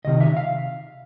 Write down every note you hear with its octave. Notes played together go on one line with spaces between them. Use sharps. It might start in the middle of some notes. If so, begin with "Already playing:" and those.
C#2 C3 D#3 D#5
E5
F5